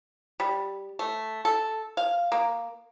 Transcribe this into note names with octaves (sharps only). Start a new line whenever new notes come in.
G3
A3
A4
F5
A#3